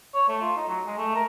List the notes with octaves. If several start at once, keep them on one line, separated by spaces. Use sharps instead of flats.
C#5
A3
F4
D#4
F#3
G#3
A3
A#4